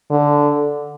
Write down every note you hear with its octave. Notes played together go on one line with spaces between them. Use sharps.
D3